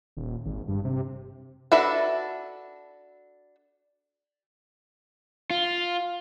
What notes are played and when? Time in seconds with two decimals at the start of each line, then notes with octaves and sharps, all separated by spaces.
0.17 D#1
0.46 G#1
0.68 G2
0.85 C3
1.72 D4 F#4 A4 B4 E5
5.51 F4